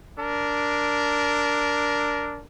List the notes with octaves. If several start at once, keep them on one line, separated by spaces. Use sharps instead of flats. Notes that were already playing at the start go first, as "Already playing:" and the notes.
D4 A#4